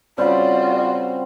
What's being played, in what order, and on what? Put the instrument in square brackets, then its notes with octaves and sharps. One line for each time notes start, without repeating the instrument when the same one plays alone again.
[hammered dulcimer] C#3 G3 C4 [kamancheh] F4 F#4 [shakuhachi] D5